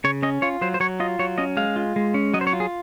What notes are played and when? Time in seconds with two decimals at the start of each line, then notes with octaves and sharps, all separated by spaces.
0.04 C#3 C#5
0.23 C#4 D#5
0.42 F4 C#5
0.61 F#3 C5
0.74 C5
0.80 F#3 C#5
1.00 F4 D#5
1.19 F#3 C#5
1.38 C#4 D#5
1.57 G#3 F5
1.76 F4
1.96 G#3
2.14 C#4
2.34 F#3 D#5
2.41 C5
2.47 C#5
2.53 F4
2.60 G#4